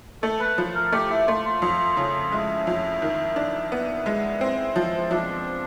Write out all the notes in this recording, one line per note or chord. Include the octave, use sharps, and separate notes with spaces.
A3 A4
B4
F3
A#4
A3 G4
E4
A3 F4
F4
F2
C#3
G#3 E4
F2
D#3
D4
B3 E4
G#3
C4
F3
F3 D4